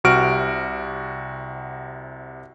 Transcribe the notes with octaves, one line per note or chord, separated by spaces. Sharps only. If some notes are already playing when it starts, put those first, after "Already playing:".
C2 C3 F#4 F6 D7